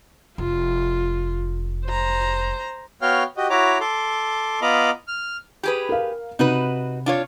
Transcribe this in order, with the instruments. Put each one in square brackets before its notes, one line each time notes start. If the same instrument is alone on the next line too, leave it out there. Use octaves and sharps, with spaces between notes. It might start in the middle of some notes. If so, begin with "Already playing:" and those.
[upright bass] F1 [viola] F4
[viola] C5 A#5
[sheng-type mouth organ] B3 F#4 C#5 F5 G5 F6
F#4 G4 D#5
E4 F#4 C#5 A#5 D6
A4 C6 D6
B3 F4 D#5 A#5 B5 D6
F6
[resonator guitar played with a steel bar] G4 G#4 B4
[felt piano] A#4 F5
[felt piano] C3 [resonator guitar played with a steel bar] D#4 F#4 B4
[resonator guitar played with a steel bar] D4 F4 C#5